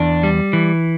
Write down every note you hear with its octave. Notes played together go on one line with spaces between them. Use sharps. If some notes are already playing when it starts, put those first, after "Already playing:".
Already playing: E2 D4
G3
E3